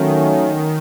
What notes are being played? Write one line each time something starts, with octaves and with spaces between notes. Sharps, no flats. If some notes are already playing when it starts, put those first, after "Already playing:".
Already playing: D#3 F#3 A3 C#4